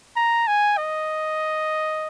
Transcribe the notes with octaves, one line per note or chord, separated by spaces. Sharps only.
A#5
G#5
D#5